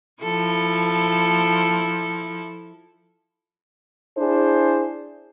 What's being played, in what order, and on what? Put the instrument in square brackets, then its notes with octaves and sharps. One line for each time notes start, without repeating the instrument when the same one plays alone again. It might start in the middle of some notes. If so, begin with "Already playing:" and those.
[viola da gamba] F3 E4 A4
[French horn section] D4 E4 G#4 C5